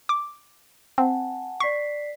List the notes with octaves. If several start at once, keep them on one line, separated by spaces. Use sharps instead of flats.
D6
C4 F#5 G#5 A5
D5 C#6 B6 C7